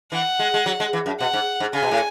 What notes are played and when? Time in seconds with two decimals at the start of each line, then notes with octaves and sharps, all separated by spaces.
0.12 E3 F#5
0.39 G#3
0.54 G#3
0.66 F#3
0.80 G#3
0.93 E3
1.06 F#2
1.19 B2 F#5
1.33 G#2
1.60 G#2
1.73 C#3 G#5
1.83 B2
1.91 A2